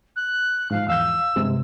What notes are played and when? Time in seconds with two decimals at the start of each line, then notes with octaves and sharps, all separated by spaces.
0.16 F#6
0.71 G#2 F3 F5
0.88 E2 F5 E6 G6
1.36 G2 C3 G#3